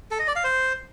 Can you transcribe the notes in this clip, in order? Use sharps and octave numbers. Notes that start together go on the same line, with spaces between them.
A4
D#5
D5
F5
C5